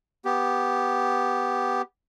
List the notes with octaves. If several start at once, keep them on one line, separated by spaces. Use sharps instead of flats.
B3 G4